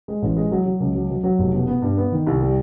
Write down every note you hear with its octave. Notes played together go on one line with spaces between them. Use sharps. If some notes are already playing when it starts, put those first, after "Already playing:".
G#3
A1
G#3
F#3
F#3
C#2
F#3
F#3
F#3
F1
B2
B3
G2
B3
D#3
C2
G3